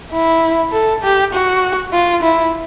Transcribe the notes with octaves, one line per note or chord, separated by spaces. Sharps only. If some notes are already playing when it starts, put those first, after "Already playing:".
E4
A4
G4
F#4
F4
E4